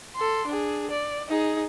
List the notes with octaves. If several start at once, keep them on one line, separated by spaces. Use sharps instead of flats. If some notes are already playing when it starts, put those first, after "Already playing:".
A4 C6
D4 G#4
D5
D#4 G#4